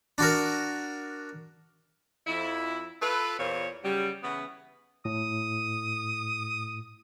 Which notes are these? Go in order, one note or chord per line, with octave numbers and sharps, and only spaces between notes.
D4 F#4 A#4
F2 E4
F4 A4 B4
E2 A#2 A#3 C5 C#5
C#3 F#3 G3
C#3 E3 B3
A2 D#6